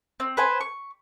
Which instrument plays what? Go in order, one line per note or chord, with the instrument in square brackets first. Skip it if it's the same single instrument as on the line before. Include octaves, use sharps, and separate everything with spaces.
[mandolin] C4
B4 C5 G#5
C#6